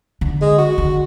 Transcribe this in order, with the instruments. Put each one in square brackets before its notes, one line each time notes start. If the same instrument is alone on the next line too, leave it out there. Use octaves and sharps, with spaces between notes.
[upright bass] D3
[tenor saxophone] G#3
F#4
[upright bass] D3